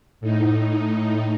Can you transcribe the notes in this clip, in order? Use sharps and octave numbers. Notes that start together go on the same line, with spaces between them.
A2 D#4